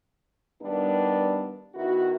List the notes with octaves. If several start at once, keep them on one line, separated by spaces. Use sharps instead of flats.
G2 D#3 G3 B3 D4
D#3 B3 E4 F#4